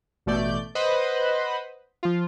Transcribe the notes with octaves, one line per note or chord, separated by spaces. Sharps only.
A1 B2 A3 D5 G6
B4 C5 D#5 F#5 B5
F3 F4